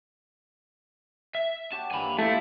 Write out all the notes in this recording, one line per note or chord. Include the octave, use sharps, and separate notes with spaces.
E5
F#4 G4 C#5 A5
G2 E3 A#3 G#5 B5
A#2 F3 A3 E4